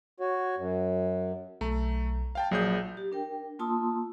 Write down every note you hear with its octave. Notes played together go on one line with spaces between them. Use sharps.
F#4 C#5
F#2
B1 A3 A#5
F5 G5 A5
A#1 F#3 G#4 G6
G4
D4 A#4 G5
A#3 F4 A5 C6 D#6 E6